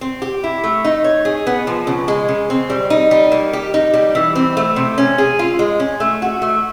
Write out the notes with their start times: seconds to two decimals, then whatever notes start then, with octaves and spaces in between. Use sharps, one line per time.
0.01 C4
0.22 G4
0.44 E4
0.64 A3
0.85 D#4
1.04 C#5
1.25 G#4
1.47 B3
1.67 F3
1.87 C#3
2.08 G#3
2.28 C#3
2.50 C4
2.70 G3
2.90 D#4
3.11 G3
3.32 A#3
3.53 G4
3.74 D#4
3.94 G3
4.15 E3
4.35 C4
4.57 A3
4.76 C3
4.98 C#4
5.18 G#4
5.39 F4
5.59 G#3
5.80 C#4
6.00 A3
6.22 F#4
6.42 A3